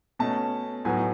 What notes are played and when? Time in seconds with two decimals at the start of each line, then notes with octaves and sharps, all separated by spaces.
0.19 B2 A3 C#4 A5
0.85 A2 F#3 B3 D#4 G#5